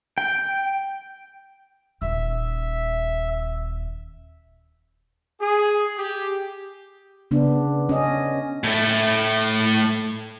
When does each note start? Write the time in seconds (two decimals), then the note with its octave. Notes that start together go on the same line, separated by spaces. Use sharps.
0.18 G5
2.02 D#1 E5
5.41 G#4
5.97 G4
7.31 C#3 B3 D4
7.89 C#4 D#5
8.64 A2 A3